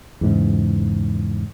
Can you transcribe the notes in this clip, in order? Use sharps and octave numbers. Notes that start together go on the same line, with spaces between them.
E2 G#2 C#3